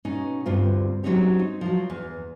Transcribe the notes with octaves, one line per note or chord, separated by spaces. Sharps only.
B2 C#4 D#4
D2 G2 C4 F4
F#3 A#3 C4 C#4 D#4 G4
D#4
F3 F#3
E2